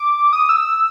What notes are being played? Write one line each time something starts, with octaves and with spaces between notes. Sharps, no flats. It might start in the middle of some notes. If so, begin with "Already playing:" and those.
Already playing: D6
D#6
E6